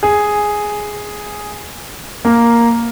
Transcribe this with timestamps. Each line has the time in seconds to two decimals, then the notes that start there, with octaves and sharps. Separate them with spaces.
0.03 G#4
2.25 A#3